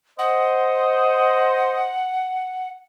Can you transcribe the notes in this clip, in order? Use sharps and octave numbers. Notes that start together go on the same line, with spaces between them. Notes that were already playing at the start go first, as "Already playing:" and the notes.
C5 D#5 F#5